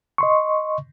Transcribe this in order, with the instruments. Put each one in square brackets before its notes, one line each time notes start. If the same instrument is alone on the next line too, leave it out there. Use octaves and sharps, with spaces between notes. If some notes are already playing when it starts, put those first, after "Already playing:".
[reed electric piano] D#5 C6 C#6